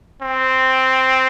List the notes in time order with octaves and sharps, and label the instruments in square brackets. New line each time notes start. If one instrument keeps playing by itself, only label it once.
[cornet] C4